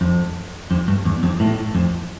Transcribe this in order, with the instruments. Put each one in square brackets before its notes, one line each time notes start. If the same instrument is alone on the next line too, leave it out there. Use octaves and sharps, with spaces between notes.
[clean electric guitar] F2
F2
G2
E2
F2
A2
F2